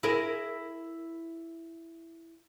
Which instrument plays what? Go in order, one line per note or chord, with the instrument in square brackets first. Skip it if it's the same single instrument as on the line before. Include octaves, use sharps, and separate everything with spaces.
[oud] E4 G#4 A#4